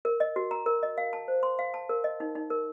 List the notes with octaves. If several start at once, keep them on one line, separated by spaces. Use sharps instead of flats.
A#4
D#5
F#4
A#5
A#4
D#5
F5
A5
C5
C6
F5
A5
A#4
D#5
D#4
D#4
A#4